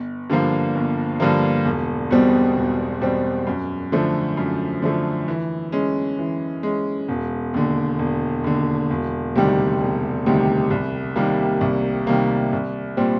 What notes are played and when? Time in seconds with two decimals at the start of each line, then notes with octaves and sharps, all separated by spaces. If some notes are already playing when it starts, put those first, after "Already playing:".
Already playing: G1
0.30 G2 D3 F3 A#3
0.75 G1
1.20 G2 D3 F3 A#3
1.65 E1
2.11 E2 B2 G3 C4
2.56 E1
3.01 E2 B2 G3 C4
3.47 F#2
3.92 D3 F3 A3
4.37 F#2
4.82 D3 F3 A3
5.28 E3
5.72 G#3 C#4
6.19 E3
6.63 G#3 C#4
7.08 E1
7.54 D#2 D3
7.99 E1
8.44 D#2 D3
8.90 E1
9.35 D2 C3 D#3 G3
9.81 E1
10.26 D2 C3 D#3 G3
10.70 C2
11.16 C3 D#3 G3 A#3
11.61 C2
12.07 C3 D#3 G3 A#3
12.53 C2
12.97 A#2 G3 C4